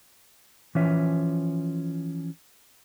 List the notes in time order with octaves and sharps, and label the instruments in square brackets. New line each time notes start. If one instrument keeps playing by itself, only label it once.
[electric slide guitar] E3 F3 C#4 E5